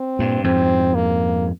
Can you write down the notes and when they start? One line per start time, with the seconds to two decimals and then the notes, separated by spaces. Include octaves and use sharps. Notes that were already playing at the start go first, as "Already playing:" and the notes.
Already playing: C4
0.19 G2 A#2
0.44 F2 G#2 C4
0.95 A#3